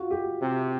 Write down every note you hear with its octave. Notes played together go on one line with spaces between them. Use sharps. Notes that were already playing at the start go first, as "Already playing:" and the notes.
Already playing: F4 F#4
G4
C3